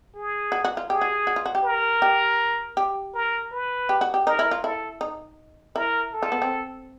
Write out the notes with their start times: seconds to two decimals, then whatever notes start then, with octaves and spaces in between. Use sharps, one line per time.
0.15 G#4
0.52 F#4
0.65 F#4
0.77 F4
0.90 G4 G#4
1.01 F#4
1.27 F#4
1.36 F4
1.46 F#4
1.55 G4
1.64 A#4
2.02 G4
2.77 G4
3.14 A#4
3.52 B4
3.89 G4
4.01 F#4
4.14 G4
4.26 D#4 A#4
4.39 E4
4.51 F4
4.64 E4 A4
5.01 D#4
5.76 E4 A#4
6.13 A4
6.23 F4
6.32 B3
6.42 C4